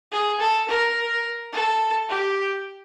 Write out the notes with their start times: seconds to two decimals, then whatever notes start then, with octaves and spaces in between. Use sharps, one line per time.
0.12 G#4
0.40 A4
0.68 A#4
1.52 A4
2.09 G4